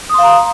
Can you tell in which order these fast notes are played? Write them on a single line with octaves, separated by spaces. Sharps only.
D#6 C6 F5 A#5